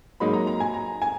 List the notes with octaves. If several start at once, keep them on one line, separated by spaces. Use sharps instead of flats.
G#2 F#3 A#3 D#4 B5
A#5
A#5
G#5
A#5
G#5